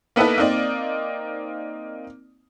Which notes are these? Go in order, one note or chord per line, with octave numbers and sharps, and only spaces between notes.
A#3 B3 D#4 E4 A4 B4
A#3 C4 D#4 D5